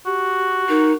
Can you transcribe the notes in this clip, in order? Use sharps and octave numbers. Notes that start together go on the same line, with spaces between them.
F#4 G4
D#4 A#4